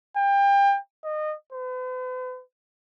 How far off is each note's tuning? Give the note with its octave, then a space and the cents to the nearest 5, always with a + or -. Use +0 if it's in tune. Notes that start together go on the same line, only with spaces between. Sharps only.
G5 +30
D#5 -25
B4 +45